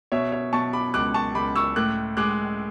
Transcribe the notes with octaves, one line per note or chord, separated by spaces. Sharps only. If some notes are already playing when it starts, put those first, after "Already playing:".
B2 C#5 E5
C#5 E5
B2 A5 C#6
B5 D6
C#2 D6 F#6
A5 C#6
C#2 B5 D6
C#6 E6
A2 D6 F#6
G#3 D6 F#6